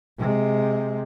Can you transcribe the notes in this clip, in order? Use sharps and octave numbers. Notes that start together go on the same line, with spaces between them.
C3 G#3